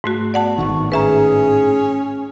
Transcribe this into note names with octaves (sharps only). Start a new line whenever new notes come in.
G#2 A3 F#4
B3 D5 F#5 A5
G#1 A2 D#3 C#6
C#4 G#4 B4 E5 A#5